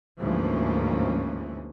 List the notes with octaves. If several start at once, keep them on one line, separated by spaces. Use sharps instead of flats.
D2 G#2 E3 F3 A#3 C#4